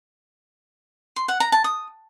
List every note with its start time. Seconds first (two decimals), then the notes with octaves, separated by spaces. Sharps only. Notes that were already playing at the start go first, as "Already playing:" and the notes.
1.16 C6
1.28 F#5
1.40 A#5
1.52 A5
1.64 D#6